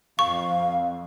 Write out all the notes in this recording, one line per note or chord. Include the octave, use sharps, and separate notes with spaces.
F2 F5 C#6